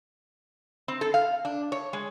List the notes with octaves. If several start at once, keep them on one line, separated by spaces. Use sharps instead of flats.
C4
A4
F5
D4
C#5
G#3